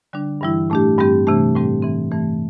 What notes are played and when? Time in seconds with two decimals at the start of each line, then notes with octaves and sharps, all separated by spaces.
0.13 D3 G3 D4
0.41 G2 E3 G3 E4
0.70 A2 A3 D4 G4
0.98 G2 G3 C4 G4
1.27 C3 E3 A3 D4 G4
1.55 A2 G3 C4 G4
1.82 G2 E3 C4
2.11 G2 E3 A3